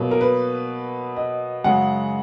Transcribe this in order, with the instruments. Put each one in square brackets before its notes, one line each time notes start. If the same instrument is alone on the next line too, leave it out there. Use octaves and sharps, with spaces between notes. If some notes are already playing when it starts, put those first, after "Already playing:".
Already playing: [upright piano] B2 F#3 A#3
A#4
B4
D#5
F#2 C#3 G#3 F#5